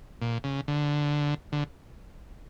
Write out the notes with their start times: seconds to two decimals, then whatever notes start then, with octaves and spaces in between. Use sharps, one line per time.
0.22 A#2
0.44 C#3
0.68 D3
1.52 D3